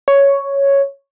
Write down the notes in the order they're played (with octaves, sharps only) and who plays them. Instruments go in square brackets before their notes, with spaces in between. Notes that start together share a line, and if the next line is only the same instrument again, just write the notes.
[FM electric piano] C#5